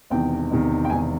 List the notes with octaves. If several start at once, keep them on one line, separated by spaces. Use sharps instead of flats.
E1 E2 C3 D#3 G5
E1 E2 C3 D#3
G5
E1 E2 C3 D#3 G#5